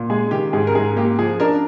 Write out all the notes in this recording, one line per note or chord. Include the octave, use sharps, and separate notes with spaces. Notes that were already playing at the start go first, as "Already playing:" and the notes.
Already playing: A#2
G#3 G#4
D#3 G4
G#2 G#4
A#4
G#2 G#4
A#3 G4
F3 G#4
D4 A#4